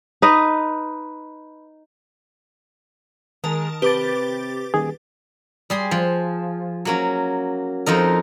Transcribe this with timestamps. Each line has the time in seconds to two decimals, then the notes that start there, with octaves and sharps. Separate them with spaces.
0.22 D#4 B4 D#5
3.44 D#3 G#3 A#4 A5
3.82 C3 G4 B4 D6 A6
4.74 D#1 D#3 G#4
5.70 G3 G#4 C6
5.91 F3
6.85 F#3 A#3 C#4
7.86 F2 F3 D#4 A#4